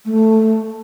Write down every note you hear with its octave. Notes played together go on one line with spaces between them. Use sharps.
A3